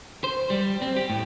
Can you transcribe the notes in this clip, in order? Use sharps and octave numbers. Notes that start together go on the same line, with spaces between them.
C5
G3
C4
G4
A2